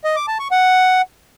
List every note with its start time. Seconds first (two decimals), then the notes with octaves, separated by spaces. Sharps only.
0.04 D#5
0.16 D6
0.28 A5
0.39 C#6
0.51 F#5